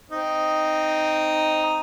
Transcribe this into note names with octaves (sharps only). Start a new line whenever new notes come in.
C4 D#4